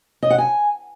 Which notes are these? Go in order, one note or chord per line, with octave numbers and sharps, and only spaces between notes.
D#5
F#5
G#5